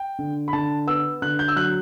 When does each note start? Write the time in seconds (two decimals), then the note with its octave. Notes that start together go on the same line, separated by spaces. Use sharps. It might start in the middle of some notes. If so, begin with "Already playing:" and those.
Already playing: G5
0.19 D3
0.48 B5
0.53 D3 A5
0.87 B3 E6
1.22 D3 F#6
1.39 G6
1.48 E6
1.56 F#3 F#6